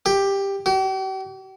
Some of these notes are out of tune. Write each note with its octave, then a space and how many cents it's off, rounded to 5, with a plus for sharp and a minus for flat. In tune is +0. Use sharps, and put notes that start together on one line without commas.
G4 +10
G4 -45